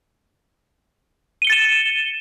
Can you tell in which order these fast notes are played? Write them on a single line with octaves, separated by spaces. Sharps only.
D#7 G7 C#7 A6 E7